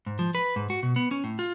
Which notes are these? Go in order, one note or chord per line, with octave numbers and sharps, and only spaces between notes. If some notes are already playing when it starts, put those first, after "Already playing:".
G#2
F3
B4
G#2
F#4
B2
B3
C#4
A2
F4